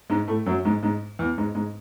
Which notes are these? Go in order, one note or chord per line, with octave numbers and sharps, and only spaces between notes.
G#2 G#3
A2 A3
F#2 F#3
G#2 G#3
G#2 G#3
E2 E3
G#2 G#3
G#2 G#3